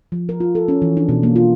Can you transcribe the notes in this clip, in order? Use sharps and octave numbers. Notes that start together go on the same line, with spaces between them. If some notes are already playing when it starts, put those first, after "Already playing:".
F3
A#4
F4
A4
C#4
E3
D4
B2
A#3
F4